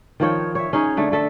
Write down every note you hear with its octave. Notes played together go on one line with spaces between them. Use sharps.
D#3 F3 C#5 G5
C#5 E5
C#4 D#4 G#4 C#5
D3 A3
A3 A4 E5